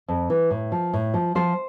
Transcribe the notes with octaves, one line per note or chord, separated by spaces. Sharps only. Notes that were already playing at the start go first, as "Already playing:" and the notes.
F2
E3
A2
F3
A2
F3
F3 C5